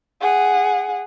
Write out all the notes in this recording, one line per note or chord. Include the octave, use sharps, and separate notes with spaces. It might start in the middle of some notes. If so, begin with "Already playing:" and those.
G#4 F#5